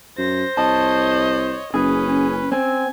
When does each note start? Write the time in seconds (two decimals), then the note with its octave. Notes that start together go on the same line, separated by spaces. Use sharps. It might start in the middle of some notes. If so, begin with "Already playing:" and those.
0.18 F#2 C5 A#6
0.57 C2 C#5 D#5 A5
1.74 F#1 C#4 G#4 B4
2.52 C4 G#5